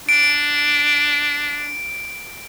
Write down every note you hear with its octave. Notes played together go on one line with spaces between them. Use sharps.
D4 D7